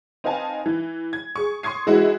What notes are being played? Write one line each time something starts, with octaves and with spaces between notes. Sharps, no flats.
C4 D#4 B4 F5 G#5 A5
E3
G#6
G#4 C#6
C6 C#6 D#6 G#6 C7
E3 G#3 E4 F#4 B4